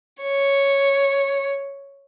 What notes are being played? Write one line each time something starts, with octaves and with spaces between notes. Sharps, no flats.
C#5